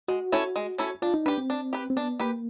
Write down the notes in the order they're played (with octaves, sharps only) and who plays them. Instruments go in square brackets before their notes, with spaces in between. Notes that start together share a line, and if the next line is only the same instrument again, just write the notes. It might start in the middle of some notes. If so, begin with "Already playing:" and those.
[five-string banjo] G#3 [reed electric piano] F#4
[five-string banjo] C#4 E4 A4 C#5
G#3
C#4 E4 A4 C#5
[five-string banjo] D4 [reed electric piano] F4
[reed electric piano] D#4
[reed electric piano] D4 [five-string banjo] G4 B4
[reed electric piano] C4
[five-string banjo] D4
G4 B4
[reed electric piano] C4
[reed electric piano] B3 [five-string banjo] D4
[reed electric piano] A#3 [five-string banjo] G4 B4